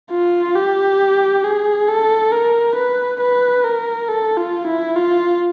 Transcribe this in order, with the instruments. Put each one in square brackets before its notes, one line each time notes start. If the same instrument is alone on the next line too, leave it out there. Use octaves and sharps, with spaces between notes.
[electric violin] F4
G4
G#4
A4
A#4
B4
B4
A#4
A4
F4
E4
F4